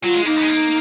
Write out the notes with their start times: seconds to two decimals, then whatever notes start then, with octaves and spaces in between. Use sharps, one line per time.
0.04 F#3 F4
0.15 G#3
0.26 A#3 D#4
0.37 B3
0.43 G#3
0.48 A#3